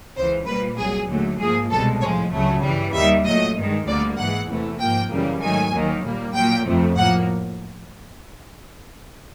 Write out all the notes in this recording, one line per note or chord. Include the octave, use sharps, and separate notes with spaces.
C#2 C#3 E3 C5
A#2 G3 A#3 B4
C2 A#2 F#3 G#4
D#2 D3 F#3 A3
G#2 F3 A#3 G#4
C2 B2 G#3 A4
A2 F3 G#3 C#5
C#2 C#3 F#3 A3
G2 E3 G3
D#2 D#3 G3 E5
A#2 F#3 A3 D#5
G2 D#3 G#3
D2 D3 G3 A#3 D5
G#2 E3 G#3 F#5
E2 C3 E3 A3
G#2 F3 A#3 G5
F#2 C#3 E3 G3 A#3
G#2 D#3 F#3 A3 G#5
D#2 D#3 F#3 A#3
A#2 G3 A#3
A#2 F#3 A#3 G5
F2 C3 F3 A3
A2 F3 A#3 F#5